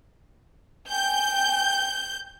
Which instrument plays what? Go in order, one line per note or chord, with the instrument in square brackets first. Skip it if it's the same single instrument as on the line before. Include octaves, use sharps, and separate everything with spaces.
[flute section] G5 G#5 [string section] G6